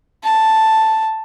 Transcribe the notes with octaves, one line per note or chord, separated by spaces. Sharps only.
A5